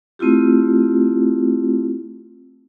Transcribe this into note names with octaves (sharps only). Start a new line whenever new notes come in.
A3 C4 E4 F4 G4